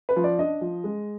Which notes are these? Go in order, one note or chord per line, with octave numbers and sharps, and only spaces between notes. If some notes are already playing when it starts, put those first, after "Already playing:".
B4
F3
D5
D4 D#5
F3
G#3